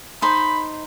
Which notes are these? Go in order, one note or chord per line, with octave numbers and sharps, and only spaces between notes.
D#4 C5 B5